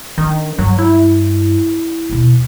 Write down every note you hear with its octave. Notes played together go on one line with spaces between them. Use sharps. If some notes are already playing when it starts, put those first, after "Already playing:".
D#3 D4
G2 F#3
E4
D#2 B2